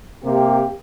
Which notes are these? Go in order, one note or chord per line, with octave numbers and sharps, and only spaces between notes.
C3 A#3 G4